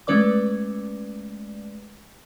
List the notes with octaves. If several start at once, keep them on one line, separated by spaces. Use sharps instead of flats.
G#3 A3 C#4 B4 D5 D6